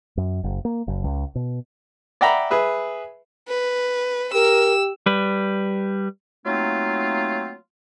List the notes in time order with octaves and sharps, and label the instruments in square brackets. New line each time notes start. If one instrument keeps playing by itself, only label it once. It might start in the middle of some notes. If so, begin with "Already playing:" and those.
[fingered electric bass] F#2
F#1
A#3
F#1
C#2
B2
[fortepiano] D5 E5 F#5 G5 A#5 B5
G#4 B4 E5
[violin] B4
[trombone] G4 [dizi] A#4 [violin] E6
[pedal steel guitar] G3 B4
[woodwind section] F#3 A3 A#3 C4 D#4 F4